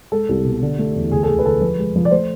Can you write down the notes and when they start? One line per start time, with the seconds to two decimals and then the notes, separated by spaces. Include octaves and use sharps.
0.12 G#3 A4
0.29 C2
0.44 B2
0.62 D3
0.79 A3
0.95 E2
1.12 D2 G#4
1.23 A4
1.28 D2 G#4
1.39 B4
1.45 D3 A4
1.61 F3 B4
1.78 G#3
1.96 F3
2.05 D5
2.11 A3 C5